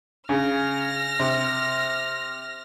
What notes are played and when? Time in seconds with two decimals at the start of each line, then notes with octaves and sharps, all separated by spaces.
0.29 C#3 F6 A#6
1.19 C3